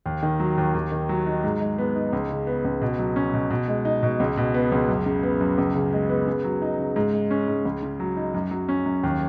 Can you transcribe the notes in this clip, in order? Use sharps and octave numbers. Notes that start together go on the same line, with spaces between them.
D#2
D#3
F#3
D#2
D#2
D#3
F#3
D#4
G#2
G#3
B3
D#4
C#2
C#3
B3
C#2
B2
F#3
C#4
B2
B2
G#3
D#4
B2
C#2
B2
B3
C#2
F#2
C#3
B3
F#2
C#2
C#3
G#3
B3
C#3
F#3
D#4
C#3
G#2
G#3
C#4
G#2
C#2
C#3
F#3
D#4
F#2
F#3
C#4
F#2
D#2